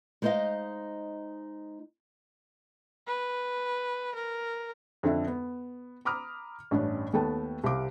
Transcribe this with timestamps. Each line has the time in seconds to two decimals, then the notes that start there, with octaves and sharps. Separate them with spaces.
0.22 G#3 D#4 C5 D5 D#5 F5
3.07 B4
4.15 A#4
5.03 F2 D3 D4 E5
5.27 B3
6.05 A#5 B5 D6 D#6 F6
6.71 A1 G2 C#4 D4
7.13 D#2 A3 B3 G5 A5
7.64 C2 C3 F5 D6